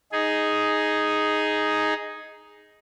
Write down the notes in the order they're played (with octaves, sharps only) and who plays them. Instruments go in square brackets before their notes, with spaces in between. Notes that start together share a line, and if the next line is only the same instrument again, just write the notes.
[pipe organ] D#4 G#4